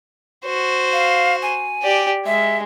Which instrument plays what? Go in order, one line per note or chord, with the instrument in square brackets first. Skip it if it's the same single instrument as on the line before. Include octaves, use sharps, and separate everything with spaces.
[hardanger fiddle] F#4 C5
[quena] F5
G#5
[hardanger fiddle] G4 D5
[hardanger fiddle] G#3 [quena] E5